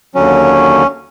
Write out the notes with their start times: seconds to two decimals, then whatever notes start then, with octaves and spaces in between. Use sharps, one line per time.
0.15 D#2 D3 F#3 C#4